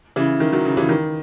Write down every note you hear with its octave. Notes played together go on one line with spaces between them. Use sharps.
C#3 E3
D#3
D#3 F#3
C#3
C#3 E3
D#3